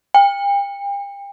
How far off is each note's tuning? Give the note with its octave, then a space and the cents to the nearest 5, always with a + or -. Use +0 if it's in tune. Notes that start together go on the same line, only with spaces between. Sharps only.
G5 +40